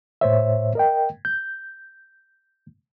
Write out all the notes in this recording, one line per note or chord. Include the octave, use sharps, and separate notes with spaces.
A2 C5 C#5 E5
A#4 D#5 G5
G6